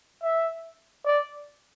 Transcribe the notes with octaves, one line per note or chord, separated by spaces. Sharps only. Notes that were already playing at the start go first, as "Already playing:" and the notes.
E5
D5